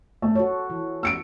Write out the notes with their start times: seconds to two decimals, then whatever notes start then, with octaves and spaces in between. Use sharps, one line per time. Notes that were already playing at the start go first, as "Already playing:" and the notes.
0.22 A3
0.35 F#4 A4 C#5
0.70 E3
1.03 E6 C#7 D7